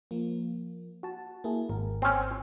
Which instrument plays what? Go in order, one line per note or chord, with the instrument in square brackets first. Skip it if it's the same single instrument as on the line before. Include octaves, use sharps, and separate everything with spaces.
[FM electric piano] F3 A#3
F#4 A5
A#3 E4 G#4
G#1 A#4
[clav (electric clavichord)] C4 C#4